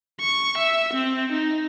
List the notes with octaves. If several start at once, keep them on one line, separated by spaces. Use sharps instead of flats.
C#6
E5
C4
D#4